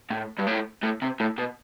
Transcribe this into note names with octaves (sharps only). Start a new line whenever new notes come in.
A2
G2
A2
A2
C3
A2
B2